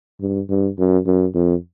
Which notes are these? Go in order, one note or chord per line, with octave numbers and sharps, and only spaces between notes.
G2
G2
F#2
F#2
F2